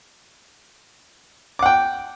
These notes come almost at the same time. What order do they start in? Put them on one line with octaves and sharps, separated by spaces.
D6 F#5 G5